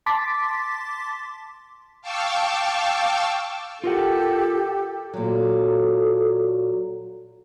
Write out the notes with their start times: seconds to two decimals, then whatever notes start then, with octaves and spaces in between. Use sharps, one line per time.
0.06 A5 C6 D6 A6 B6
2.01 F5 G5 A5 C#6 D6 E6
3.84 F4 G4 A4 A#4 F#5
5.14 A#2 F#3 A4